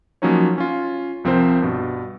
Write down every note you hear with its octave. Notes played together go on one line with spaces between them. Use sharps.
F3 F#3 A#3 C#4 D#4 C#5
C#4 F4
C2 F3 C4 A#4 C5
G2 B2